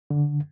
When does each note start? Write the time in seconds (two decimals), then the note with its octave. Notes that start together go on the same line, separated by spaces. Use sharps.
0.10 D3